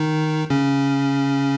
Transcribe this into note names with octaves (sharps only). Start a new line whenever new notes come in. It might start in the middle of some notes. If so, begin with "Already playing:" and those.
Already playing: D#3 D#4
C#3 C#4